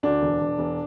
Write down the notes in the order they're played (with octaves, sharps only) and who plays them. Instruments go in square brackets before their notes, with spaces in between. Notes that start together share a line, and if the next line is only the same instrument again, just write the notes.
[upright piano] D2 D4
E1
E1
E1